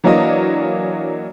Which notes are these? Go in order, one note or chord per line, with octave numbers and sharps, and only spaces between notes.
E3 F#3 A#3 D4 C#5 D#5